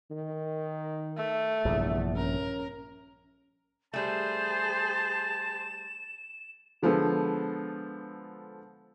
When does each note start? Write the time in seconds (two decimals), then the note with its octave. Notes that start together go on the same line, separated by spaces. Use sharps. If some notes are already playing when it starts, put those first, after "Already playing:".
0.11 D#3
1.17 A3
1.65 A#1 E2 G2 C3
2.17 C#4 A#4
3.93 G3 A3 G#4 C5 A5 E7
6.82 D3 F3 G#3 B3 A4